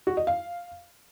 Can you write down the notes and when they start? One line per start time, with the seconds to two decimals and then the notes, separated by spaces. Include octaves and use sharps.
0.07 F#4
0.17 D#5
0.27 F5